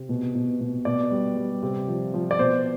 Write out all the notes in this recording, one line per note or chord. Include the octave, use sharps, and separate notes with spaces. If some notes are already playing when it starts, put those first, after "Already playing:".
Already playing: C3
B2
B2
B2
B2 D5
G3
G3
C3
F3
F3
D5
B2 C5